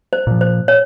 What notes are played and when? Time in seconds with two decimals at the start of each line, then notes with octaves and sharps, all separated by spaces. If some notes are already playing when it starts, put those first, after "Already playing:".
0.13 C5
0.27 A#2 F3
0.41 C5
0.68 C#5